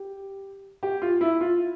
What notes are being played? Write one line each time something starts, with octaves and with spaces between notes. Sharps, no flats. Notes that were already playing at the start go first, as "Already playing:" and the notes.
Already playing: G4
G4
F4
E4
F4